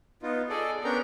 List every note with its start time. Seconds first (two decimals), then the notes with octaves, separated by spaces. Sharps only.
0.23 B3 D#4 F4
0.50 G#4 A4 D5 D#5
0.84 B3 C#4 D4 A#4 G5 A#5